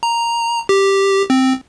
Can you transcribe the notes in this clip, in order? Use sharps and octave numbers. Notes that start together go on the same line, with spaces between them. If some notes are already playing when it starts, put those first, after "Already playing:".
A#5
G4
C4